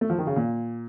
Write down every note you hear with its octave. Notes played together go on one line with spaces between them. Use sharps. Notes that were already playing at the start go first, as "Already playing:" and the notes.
A3
F3
D#3
C#3
A#2